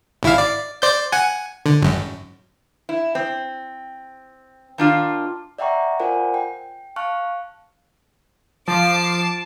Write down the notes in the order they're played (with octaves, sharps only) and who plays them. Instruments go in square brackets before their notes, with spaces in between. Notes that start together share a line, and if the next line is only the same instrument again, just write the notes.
[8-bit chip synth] G#1 E4 F5
D5
C5 D5 G6
F#5 G#5
D3
G#1 F#2
[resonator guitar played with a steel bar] E4
C4
D#3 D4 F4
[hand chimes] D5 E5 F#5 G5 A#5 C#6
F4 A#4 C5 D5 F#5 G#5
G5
F5 A5 C#6 F6 F#6
[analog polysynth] F3 [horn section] A5 [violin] D6 C7